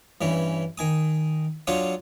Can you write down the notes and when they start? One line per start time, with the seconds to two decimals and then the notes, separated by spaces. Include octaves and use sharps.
0.21 G2 E3 C#4
0.78 D#3 G#5 D#6
1.67 F#3 D4 F4 C#5 D#6